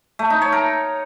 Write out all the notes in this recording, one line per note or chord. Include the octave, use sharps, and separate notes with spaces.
A3
D#4
C#5
A#4